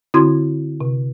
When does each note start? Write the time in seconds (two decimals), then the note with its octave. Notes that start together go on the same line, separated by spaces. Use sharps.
0.14 D3 C4 E4 F#4 C6 G#6
0.81 C3